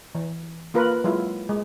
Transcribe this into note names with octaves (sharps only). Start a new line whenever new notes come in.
E3
A#3 F4 A#4 B4
F#3 G#3 E4 F4
G#3